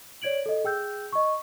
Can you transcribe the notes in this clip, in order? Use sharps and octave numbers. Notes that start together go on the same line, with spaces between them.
C#5 D5 G#6 D7 F#7
A4 D#5
G#4 G5 E6 G6
D#5 C#6